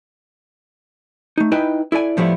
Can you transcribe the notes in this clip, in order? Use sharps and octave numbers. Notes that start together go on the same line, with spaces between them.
A3 D#4
D#4 E4 B4 D#5 G5 G#5
E4 A4 D5 G#5
A2 F3 G3 A3 B3 E4